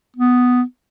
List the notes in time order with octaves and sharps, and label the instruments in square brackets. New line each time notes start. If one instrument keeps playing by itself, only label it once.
[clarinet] B3